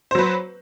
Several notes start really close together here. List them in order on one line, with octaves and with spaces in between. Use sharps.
C5 F#3 B4